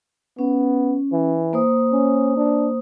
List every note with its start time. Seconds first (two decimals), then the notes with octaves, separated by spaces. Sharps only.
0.39 B3 C#4
1.13 E3
1.53 A#3 C5 D#6
1.92 C#4
2.37 D4